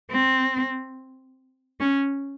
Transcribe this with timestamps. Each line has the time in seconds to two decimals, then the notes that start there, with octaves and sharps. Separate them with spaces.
0.11 C4
1.80 C#4